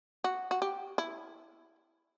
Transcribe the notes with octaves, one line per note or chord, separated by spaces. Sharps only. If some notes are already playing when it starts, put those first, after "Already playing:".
F#4
F#4
G4
E4